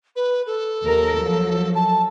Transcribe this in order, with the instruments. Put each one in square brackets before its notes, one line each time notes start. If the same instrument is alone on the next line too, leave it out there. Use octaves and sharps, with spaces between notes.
[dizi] B4
A4
[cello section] D#2 A#4
F3 F#3
[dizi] A5